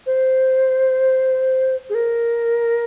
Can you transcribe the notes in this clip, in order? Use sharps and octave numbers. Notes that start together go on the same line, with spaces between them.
C5
G#4
A#4